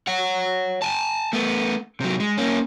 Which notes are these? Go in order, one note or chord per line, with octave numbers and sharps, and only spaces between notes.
C#5 F#5
G#5 A5
A3 B3
C3 F#3
G#3
A#3 C#4